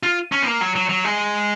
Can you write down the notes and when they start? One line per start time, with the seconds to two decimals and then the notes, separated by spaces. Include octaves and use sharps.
0.03 F4
0.32 C#4
0.42 B3
0.47 A#3
0.61 F#3
0.76 F#3
0.89 F#3
1.04 G#3